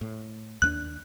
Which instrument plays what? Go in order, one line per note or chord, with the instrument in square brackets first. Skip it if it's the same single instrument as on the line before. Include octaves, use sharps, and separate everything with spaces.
[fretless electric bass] A2
[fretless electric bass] D#2 A3 D4 [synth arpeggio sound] F#6